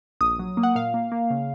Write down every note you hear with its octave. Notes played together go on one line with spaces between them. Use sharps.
A#1 D#6
F#3
A#3
F#5
A#2 F5
A#3
A#3
C#3